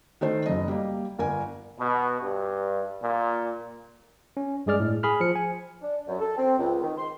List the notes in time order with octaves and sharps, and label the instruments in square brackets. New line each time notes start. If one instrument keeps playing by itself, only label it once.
[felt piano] D#3 A3 A4 C5
F#1 F#2 D#5
G3 A#3
G1 A#4 G#5
[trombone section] B2
G2
A#2
[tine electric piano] C#4
G2 G#3 G#4 D5 F6
A2
G#4 B5 F6
F3 C#7
G#5
[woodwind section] D4
F#2
A4
C4
C#2
D#3
C6